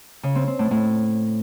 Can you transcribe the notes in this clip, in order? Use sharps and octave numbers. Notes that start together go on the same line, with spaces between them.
C#3
C4
C4
A2
A2